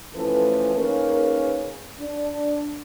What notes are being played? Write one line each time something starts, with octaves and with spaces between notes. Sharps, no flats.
E3 F3 A3 C#4 A4 B4
A#3 C#4 D#4 G#4 A#4 B4
D4